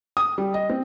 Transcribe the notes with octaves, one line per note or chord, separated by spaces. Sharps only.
D#6
G3
D#5
C4